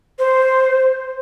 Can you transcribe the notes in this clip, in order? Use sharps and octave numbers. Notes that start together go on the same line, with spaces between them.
C5